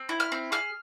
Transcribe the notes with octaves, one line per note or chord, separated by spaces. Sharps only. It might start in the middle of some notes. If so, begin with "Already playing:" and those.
Already playing: C4
E4
F6
C4
G#4 F6